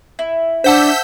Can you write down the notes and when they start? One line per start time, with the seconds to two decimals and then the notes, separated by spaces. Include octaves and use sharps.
0.19 E4
0.64 D4 C5 F#5 A5 E6 G6 B6